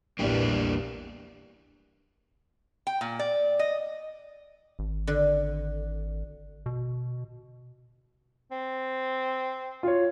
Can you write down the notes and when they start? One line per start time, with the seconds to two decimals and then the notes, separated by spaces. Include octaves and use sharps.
0.19 A#1 E2 G3 A#3 D4 G4
2.87 G5
3.01 A#2
3.19 D5
3.59 D#5
4.79 G#1
5.07 D3
6.66 B2
8.51 C4
9.83 F4 C#5